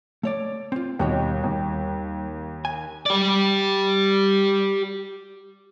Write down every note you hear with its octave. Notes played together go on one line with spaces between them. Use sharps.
A3 C#5 D5
C4 F4
D#2 B2 G3 F#4 C#5
D#2
G#5
G4 D5